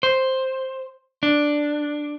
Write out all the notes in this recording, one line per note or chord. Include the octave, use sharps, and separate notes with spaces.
C5
D4